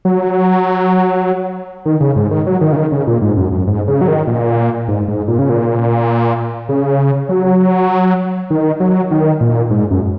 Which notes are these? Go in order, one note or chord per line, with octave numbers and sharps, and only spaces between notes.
F#3
D#3
C#3
G#2
D#3
F#3
D#3
C#3
D#3
C#3
A#2
G#2
F#2
F#2
G#2
C#3
F#3
D#3
A#2
G#2
G#2
A#2
C#3
A#2
C#3
F#3
D#3
F#3
D#3
A#2
G#2
F#2